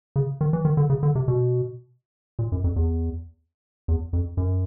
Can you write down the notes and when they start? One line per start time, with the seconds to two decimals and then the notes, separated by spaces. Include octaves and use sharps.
0.16 C#3
0.41 D#3
0.53 E3
0.65 D#3
0.77 D3
0.90 C#3
1.03 D3
1.15 C3
1.28 B2
2.39 A#2
2.52 F#2
2.64 F2
2.76 E2
3.88 E2
4.13 F2
4.37 F#2